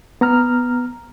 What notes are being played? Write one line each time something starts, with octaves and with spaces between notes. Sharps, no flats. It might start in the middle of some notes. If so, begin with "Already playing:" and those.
B3 A#5 F6